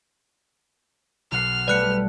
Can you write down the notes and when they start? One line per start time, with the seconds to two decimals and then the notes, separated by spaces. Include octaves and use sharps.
1.32 B1 F#5 F6 C7
1.68 G3 A3 B4 D5 F#6 C#7